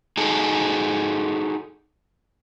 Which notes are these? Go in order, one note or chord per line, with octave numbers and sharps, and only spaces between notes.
D#4 F#4 G#4 A4